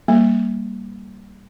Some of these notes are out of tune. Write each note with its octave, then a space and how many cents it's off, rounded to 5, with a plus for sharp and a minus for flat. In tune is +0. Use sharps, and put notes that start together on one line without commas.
G3 +0 A#3 +0